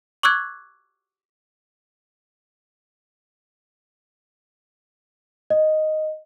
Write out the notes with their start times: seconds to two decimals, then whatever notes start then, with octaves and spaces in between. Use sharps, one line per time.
0.23 C#6 D6 E6 F#6 G#6
5.50 D#5